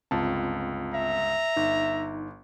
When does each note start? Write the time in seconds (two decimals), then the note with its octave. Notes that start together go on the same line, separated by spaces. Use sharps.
0.11 G1 C#2 C4 F4 A5
0.94 E5 A#5
1.57 G1 D#4